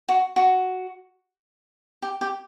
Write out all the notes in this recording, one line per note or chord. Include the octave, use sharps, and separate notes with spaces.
F#4
F#4
G4
G4